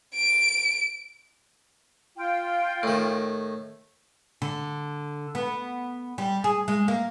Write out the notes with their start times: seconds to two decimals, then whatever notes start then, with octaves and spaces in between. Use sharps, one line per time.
0.14 D7
2.15 F4 G5
2.83 A2 D#3
4.42 D3
5.35 B3
6.18 G3
6.44 G#4
6.68 G#3
6.88 A#3